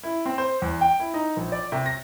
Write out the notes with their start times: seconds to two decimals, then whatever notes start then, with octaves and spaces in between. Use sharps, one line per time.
0.03 E4
0.26 C4
0.38 C5
0.62 E2
0.81 G5
1.00 E4
1.14 D#4
1.37 A#1
1.52 D5
1.72 C3
1.86 A#6